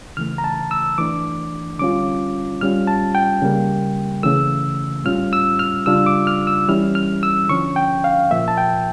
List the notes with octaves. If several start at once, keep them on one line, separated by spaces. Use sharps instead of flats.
C#3 E3 A3 F6
A#5
A5
E6
E3 A3 D4 D6
D3 G3 C#4 F4 D6
A2 G3 C#4 F4 F6
A5
G5
C#3 G3 A#3
C#3 E3 A3 E6
A2 G3 C#4 F4 F6
E6
F6
C#3 G3 D4 F4 E6
D6
F6
E6
E3 G3 C#4 E4 F6
F6
E6
D3 F3 C#4 C#6
G5
F5
A#2 F3 A#3 E5
A5
G5